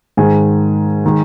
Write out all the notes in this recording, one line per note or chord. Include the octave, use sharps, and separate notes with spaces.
G#2 D#3 G#3 G#5
D#3 G#3